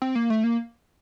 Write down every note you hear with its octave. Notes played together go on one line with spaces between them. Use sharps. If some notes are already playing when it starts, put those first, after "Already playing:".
C4
A#3
A3
A#3